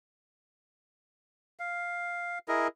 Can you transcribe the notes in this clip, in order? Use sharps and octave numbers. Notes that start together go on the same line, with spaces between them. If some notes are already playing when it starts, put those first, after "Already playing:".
F5
E4 G#4 A#4 D#5